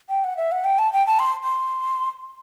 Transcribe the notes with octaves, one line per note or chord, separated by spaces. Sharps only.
G5
F#5
E5
F#5
G5
A5
G5
A5
C6
C6